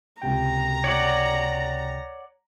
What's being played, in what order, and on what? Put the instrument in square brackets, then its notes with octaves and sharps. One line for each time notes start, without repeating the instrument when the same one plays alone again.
[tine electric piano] C#2 C3 G5 [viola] A#5
[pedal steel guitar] C#5 D5 F#5